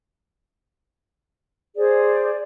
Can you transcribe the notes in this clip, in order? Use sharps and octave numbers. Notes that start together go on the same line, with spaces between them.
G#4 C5 D5